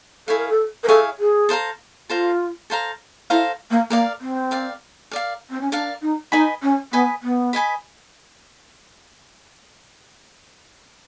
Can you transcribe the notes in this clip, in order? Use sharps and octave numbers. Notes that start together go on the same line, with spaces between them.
E4 G#4 A4 C#5 F5
A#4
A4
A#4
E4 G#4 A4 C#5 F5
G#4
A4 C5 F5 A#5
F4 A4 C5 F5 A#5
A4 C5 F5 A#5
E4 A4 C5 F5 A#5
A#3
A#3 A#4 D5 F5
C4
A#4 D5 F5
A#4 D5 F5
C4
C#4
D4 A#4 D5 F5
D#4
D#4 B4 D#5 G#5 B5
C#4
B3 B4 D#5 G#5 B5
B3
B4 D#5 G#5 B5